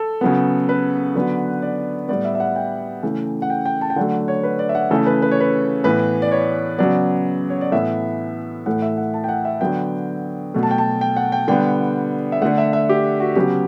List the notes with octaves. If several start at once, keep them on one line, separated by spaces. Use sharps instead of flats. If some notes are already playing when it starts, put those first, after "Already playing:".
Already playing: A4
C#3 F#3 B3
B4
D3 F#3 B3
D5
A2 G3 B3 D5
E5
E5
F#5
G5
C#3 E3 A3
F#5
G5
G5
A5
G5
D3 F#3 A3 F#5
C#5
B4
D5
E5
F#5
C#3 E3 A3 A4
B4
B4
C#5
B4
A2 E3 B3 B4
D5
C#5
C#3 F#3 B3 D5
C#5
D5
A2 E3 B3 E5
A2 E3 A3 F#5
E5
F#5
A5
G5
F#5
E5
D3 F#3 B3 G5
B2 F#3 A3
A5
G5
A5
G5
F#5
G5
D3 G3 B3 G5
E5
D3 A3 F#5
E5
E5
G4
F#4
C#3 F#3 B3 G4